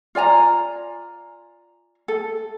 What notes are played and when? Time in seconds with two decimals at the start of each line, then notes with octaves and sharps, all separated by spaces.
0.15 F4 D5 G#5 A#5
2.08 A4